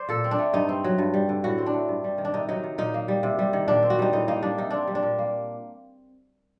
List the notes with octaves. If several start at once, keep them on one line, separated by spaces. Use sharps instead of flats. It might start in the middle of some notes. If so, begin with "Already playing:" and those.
Already playing: C5 D5
A#2 A4
C4
D4
A3
G2 D#4
C4
F#3
G2
G3
D3
A2 F#4
C4
D4
A3
G2
G3
D#3
D4
C3 D#4
F#3 D#4
D#3
A#2 D#4
A#3
G3
C3
G3
D#3
A#2 D4
C4
F#4
G3 D#4
A2 D#4
A#3 D#4
G3 D4
C3 D#4
C4 D4
G3
D4
A#2
A#3